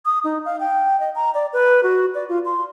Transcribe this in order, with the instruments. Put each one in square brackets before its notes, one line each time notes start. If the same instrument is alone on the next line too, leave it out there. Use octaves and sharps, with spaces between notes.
[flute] D#6
D#4
F5
G5
D#5
A#5
D5
B4
F#4
D5
F4
C6